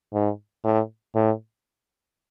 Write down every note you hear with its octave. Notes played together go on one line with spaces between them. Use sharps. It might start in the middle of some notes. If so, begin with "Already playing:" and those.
G#2
A2
A2